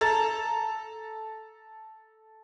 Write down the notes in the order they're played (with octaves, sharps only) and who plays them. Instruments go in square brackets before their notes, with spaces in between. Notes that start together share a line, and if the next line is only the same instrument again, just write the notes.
[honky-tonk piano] A4 A#5 A6